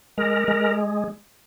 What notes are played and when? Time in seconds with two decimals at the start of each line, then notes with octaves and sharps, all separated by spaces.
0.18 G#3 A#4
0.48 G#3